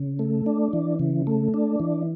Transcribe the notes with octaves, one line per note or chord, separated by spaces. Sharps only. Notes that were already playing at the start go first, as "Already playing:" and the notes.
Already playing: C#3
A3
D4
E3
C#3
A3
D4
E3